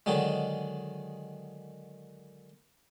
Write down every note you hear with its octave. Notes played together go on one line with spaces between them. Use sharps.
D3 D#3 F#3 G#3